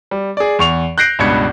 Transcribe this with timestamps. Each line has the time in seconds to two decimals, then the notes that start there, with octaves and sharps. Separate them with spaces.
0.11 G3
0.37 G#4 D5
0.59 E2 C#6 F7
0.98 F#6 G6 A#6 C7 D7
1.19 C#2 G2 B2 B5 G#6 C#7